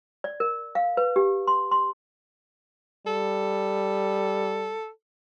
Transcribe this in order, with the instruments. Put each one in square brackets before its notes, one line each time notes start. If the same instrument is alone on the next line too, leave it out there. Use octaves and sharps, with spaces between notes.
[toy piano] D5
A#4
F5
B4
G4
C6
C6
[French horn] G3 [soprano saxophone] A4